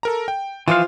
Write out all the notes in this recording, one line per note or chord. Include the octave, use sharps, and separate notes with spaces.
A4 A#4 A#5
G5
E3 F3 F4 C5 F5